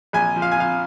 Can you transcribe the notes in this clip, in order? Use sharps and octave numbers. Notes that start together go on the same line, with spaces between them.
A#1 G#5
F3
F5
G#5
F3 F5